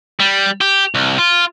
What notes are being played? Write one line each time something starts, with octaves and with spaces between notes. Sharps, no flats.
G3
G4
C2
F4